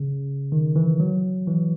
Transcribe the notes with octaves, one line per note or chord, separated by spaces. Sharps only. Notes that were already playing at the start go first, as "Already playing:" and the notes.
Already playing: C#3
D#3
E3
F#3
E3